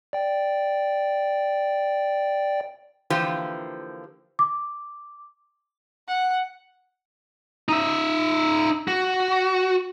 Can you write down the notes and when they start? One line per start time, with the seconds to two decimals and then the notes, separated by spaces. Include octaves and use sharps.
0.13 D5 G5
3.10 D3 E3 F3 A#3 G4 C5
4.39 D6
6.08 F#5
7.69 D#4 E5
8.88 F#4